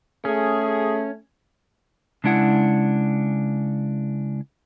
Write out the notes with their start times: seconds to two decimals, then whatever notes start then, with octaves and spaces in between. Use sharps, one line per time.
0.25 A3 C#4 G#4
2.24 C#3 G#3 D4 E4 F#5